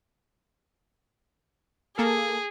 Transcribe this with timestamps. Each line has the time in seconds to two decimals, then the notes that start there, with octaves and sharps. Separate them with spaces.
1.98 A#3 G#4 A4